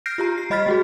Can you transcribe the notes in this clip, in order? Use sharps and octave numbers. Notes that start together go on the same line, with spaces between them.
F6 G6 A#6 C7 D7
F4 G4 A#5
C7
G3 D#5 B5 F6 A6 B6
G#3 F#4 G#4